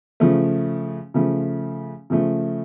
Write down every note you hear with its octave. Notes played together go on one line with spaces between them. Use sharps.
C#3 F3 A3
C#3 F3 A3
C#3 F3 A3